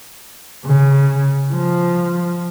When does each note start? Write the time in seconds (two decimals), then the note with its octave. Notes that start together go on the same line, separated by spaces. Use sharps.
0.65 C#3
1.54 F3